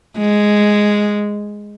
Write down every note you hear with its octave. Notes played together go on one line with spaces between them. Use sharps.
G#3